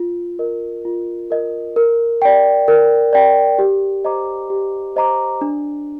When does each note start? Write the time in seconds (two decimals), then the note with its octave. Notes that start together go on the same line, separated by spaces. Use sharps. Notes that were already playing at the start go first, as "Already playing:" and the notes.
Already playing: F4
0.39 A#4 D#5
0.85 F4
1.30 A#4 D#5
1.76 A#4
2.22 D5 G5
2.68 A#4
3.13 D5 G5
3.59 G4
4.05 C5 D#5 A#5 D6
4.50 G4
4.96 C5 D#5 A#5 D6
5.41 D4